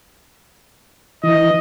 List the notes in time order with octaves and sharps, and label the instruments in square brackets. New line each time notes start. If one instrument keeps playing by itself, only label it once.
[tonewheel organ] E3 [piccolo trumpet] D#5